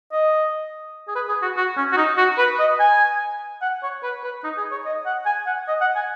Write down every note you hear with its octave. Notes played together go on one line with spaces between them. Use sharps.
D#5
G#4
B4
G#4
F#4
F#4
C#4
F#4
D#4
F#4
B4
D#5
G#5
F#5
C#5
B4
B4
D#4
G#4
C#5
D#5
F#5
G#5
F#5
D#5
F#5
G#5